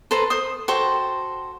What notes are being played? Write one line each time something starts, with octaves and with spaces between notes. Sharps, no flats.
A4 B4 C5 A#5
C5 D#6
F#4 A4 C5 G5